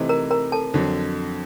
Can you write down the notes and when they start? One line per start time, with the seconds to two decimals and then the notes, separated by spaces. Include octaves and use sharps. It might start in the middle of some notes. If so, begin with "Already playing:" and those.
Already playing: C3 E3 A3 C4 D#4
0.09 A#4 A#5
0.31 A#4 A#5
0.52 A4 A5
0.74 F2 D3 F#3